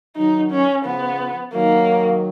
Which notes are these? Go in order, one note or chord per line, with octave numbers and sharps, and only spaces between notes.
D#3 F#3 D#4
C#4
C#3 F3 B3
D#3 F#3 A#3